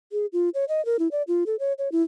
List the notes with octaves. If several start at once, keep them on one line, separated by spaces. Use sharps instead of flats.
G#4
F4
C#5
D#5
A#4
E4
D5
F4
A4
C#5
C#5
E4